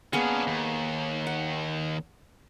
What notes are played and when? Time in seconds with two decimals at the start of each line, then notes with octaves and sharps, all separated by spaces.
0.13 A#3 B3 C#4 D4 G#4
0.47 D#2
1.27 F#5